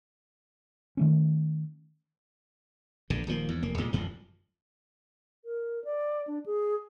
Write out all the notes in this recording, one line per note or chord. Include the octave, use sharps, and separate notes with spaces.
D#3 A3 C#4
A#1 G2 D3
D#1 D#3 F3 A#3
E2 G#2
F1 A#3
C2 A#2 G#3
D1 A1 F#2 F3
A#4
D5
D4
G#4